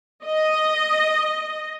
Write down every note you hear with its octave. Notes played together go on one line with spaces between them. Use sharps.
D#5